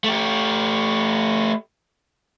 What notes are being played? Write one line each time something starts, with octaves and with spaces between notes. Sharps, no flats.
A3 G4